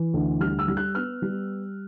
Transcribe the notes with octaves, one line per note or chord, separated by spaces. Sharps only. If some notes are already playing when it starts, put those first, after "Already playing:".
Already playing: E3
D2
G3 F6
E6
G3
F#6
B3 F6
G3